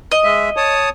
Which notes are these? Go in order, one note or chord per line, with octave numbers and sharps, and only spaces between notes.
D#5
G#3 E5
C#5 A5 D#6